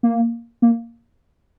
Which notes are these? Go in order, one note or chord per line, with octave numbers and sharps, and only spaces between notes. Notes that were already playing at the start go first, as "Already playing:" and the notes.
A#3
A#3